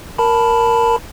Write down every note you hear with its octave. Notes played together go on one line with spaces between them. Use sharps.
A#4 A5 B5